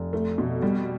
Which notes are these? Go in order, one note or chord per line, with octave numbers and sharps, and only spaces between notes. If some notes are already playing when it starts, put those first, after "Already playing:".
Already playing: F1
A3
B2
G3